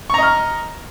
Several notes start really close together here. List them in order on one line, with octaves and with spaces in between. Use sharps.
C#6 A#5 D#5 F6